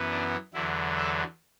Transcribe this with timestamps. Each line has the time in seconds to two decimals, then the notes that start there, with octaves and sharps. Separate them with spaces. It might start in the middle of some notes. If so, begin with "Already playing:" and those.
Already playing: F#2 E3 B3
0.11 D4
0.54 E2 D3 F#3 E4
0.97 A4